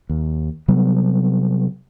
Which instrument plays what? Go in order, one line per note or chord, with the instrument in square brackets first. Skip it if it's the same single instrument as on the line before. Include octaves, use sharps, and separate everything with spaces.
[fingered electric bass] D#2
C3 F#3 G3 B3